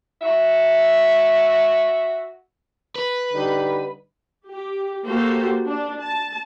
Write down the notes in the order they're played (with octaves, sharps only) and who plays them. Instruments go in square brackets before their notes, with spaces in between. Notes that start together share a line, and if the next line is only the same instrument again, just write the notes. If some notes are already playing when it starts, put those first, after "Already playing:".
[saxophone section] F#4 E5
[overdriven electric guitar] B4
[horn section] D3 G3 D#4
[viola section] G4
A#3 F#4 G4 A4 C5
D4
A5